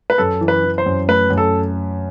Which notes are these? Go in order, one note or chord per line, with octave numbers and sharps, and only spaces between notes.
B4
F#2 A4
E3
B4
E3
C5
F#2
A3 B4
F#2
A4